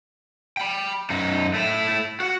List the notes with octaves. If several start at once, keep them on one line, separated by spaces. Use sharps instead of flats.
G5 B5
F#2 D#4
A3 E4
F#4 F#5